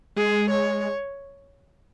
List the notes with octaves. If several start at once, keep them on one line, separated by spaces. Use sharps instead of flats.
G#3 G#4
C#5